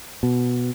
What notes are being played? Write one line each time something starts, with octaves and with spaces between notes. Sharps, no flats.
B2